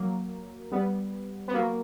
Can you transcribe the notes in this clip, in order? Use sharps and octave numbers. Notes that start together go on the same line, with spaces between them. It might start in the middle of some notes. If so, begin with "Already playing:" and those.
Already playing: F#3 A#3
G3 B3
B3
F#3 A#3